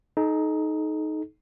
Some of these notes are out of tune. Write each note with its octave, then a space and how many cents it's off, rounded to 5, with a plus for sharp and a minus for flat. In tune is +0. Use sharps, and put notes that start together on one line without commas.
D#4 +0 A4 -40